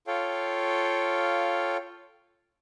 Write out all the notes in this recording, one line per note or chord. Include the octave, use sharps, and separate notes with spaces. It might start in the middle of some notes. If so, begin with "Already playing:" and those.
F4 A4 C#5 F5 G5